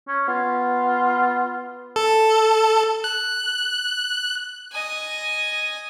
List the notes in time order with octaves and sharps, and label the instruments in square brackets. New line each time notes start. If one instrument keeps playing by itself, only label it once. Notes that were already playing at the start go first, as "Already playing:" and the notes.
[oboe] C#4
[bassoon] B3 [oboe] F4
[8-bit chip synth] A4
F#6
[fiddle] D#5 G#5